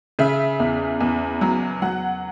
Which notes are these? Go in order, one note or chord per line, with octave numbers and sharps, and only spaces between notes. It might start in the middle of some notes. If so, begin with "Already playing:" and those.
C#3 E5
E2
E2
F#3
F#3 F#5